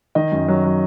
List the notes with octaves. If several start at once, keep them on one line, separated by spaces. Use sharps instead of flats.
D#3 D#5
F#2
F#3
F#3